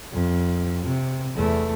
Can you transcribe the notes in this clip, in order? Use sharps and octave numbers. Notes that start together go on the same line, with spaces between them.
F2
C3
E2 A3